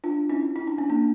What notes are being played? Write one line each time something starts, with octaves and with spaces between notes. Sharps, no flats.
D4 F4
C#4 E4
E4
D4
C#4
A#3 D4